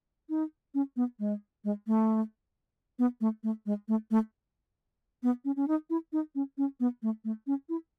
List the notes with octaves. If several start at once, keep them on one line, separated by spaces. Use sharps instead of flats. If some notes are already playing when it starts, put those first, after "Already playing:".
D#4
C#4
B3
G#3
G#3
A3
B3
A3
A3
G#3
A3
A3
B3
C#4
C#4
D#4
E4
D#4
C#4
C#4
B3
A3
A3
C#4
E4